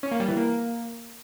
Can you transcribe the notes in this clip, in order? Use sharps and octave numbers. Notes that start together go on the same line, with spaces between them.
C#4
A#3
G3
E3
A#3